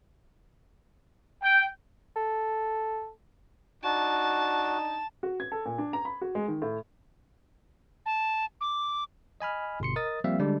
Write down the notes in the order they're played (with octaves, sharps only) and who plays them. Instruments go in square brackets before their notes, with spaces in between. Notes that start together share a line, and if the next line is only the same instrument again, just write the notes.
[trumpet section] G5
[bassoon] A4
[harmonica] D4 D#4 [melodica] F#4 [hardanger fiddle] A5
[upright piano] F#4
G#6
A4
A#2
D4
A#5
B5
F#4
G#3
D#3
A2
[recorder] A5
D6
[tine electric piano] D#5 G#5 B5 F6
G1 B2 C6 C#7
A#4 D#5 D#6 A6
F3 G3 A#3 C4 E5 F5
D3 G3 G#3 D4